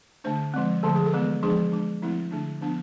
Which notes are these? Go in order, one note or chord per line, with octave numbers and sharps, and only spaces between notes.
D3 A3 D4 C5
F3 G#3 C4
D3 F3 A3 A4
G#4
A4
E3 G#3 B3
F3 G#3 D4 G#4
G#3 D4
F3 A3 C4 E4
D3 A3 D4
F3 B3 D4